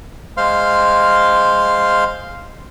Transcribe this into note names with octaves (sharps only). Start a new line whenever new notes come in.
G#3 C5 F5 C6 F6